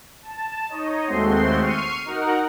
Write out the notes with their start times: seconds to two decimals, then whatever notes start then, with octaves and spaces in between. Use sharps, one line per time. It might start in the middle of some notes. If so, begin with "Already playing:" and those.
0.22 A5
0.69 D#4 C#5 D#5
1.06 D#2 G#3 A3 C4 F#4 C6
1.60 C#6 F6 C7 D#7
2.05 D#4 F#4 A#4 F#5